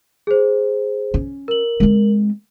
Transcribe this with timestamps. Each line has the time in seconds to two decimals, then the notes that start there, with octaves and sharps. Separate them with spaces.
0.27 G#4 C5
1.14 C#4
1.48 A#4 F#7
1.80 G#3 C4